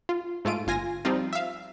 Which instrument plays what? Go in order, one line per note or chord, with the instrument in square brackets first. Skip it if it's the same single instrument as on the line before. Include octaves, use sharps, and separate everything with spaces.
[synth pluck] F4
G#2 A3 F4 D7 D#7
G1 F4 G#5 A#6
F3 G3 C4 D#4 F4
E5 F5